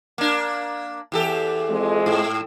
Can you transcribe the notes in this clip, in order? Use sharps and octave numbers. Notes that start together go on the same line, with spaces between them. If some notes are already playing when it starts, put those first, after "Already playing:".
A#3 D4
E2 G4 A4
F2 G#3
G#2